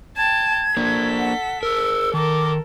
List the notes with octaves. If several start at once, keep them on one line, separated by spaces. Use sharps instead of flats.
G5 A5 G#6
A#3 D4 A4 B6
F#5
G#4 A#4 E6
D#3 A4 A#4 D6